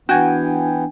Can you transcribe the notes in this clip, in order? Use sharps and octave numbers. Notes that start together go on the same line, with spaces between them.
E3 B3 D4 F#4 G5 G#5